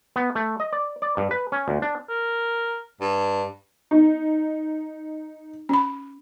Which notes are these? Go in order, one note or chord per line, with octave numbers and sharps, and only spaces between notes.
B3
A3
D#5
D5
D5
G2
B4
C#4
D2
D4
A#4
G2
D#4
C#4 B5